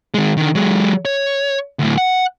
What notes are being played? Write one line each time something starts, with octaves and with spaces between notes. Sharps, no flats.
D#3 G#3
D3 D#3
F#3 G#3
C#5
D2 A2
F#5